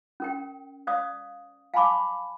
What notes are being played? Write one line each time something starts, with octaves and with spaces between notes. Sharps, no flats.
C#4 A#4 G5
C5 D5 F5 D#6
F5 G#5 A5 B5 C#6 D6